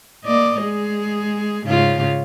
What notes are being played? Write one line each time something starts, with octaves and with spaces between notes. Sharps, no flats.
A#3 D5 D#5
G#3 G#4
G#2 C#3 F4